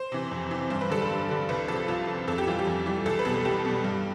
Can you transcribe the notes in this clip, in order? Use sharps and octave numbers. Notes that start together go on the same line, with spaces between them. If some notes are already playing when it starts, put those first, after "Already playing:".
Already playing: C5
C3 E3
F2
C3 E3
G2 C5
B4
D3 G3 A4
B4
G2
D3 G3
C2 B4
C3 F3 A4
C2 F4
C3 F3
F2 A4
G4
E3 G3 F4
G4
F2
E3 G3
C2 A4
B4
B2 G3 A4
C2 G4
B2 G3
G2